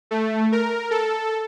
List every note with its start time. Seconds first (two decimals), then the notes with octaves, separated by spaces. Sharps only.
0.11 A3
0.52 A#4
0.91 A4